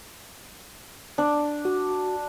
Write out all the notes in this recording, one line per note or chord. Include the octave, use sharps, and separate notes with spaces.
D4
F#4